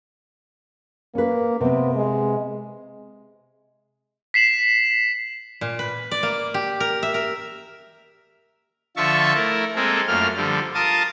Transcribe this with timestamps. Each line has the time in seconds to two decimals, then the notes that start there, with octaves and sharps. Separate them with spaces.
1.15 A#3 C#4 B4
1.61 C3 B3 C4
1.95 G#3
4.34 B6 C7 E7 F#7
5.61 A#2
5.79 B4
6.11 D5
6.23 A#3
6.54 G4
6.80 A#4
7.03 E5
7.14 A#4
8.97 D3 F3 F4 E5 A5 C#6
9.34 A3 E4 A#4
9.76 G#3 A#3 C4 G#4 A4
10.08 F#2 A3 A#3 F4 F6
10.36 D3 F3 G3
10.75 F4 A#4 F5 A5 D#6